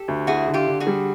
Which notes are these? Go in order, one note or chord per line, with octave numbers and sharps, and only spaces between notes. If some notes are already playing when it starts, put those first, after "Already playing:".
Already playing: G4 A4
D2
E4 F#4 G#4
D3
F4 G4
D3
F#4 G#4
G3